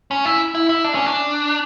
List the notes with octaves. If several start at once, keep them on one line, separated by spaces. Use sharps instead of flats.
C#4
E4
E4
E4
D4
C#4
D4